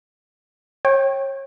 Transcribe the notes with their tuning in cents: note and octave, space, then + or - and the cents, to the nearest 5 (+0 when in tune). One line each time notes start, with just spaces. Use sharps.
C#5 -30 G5 +0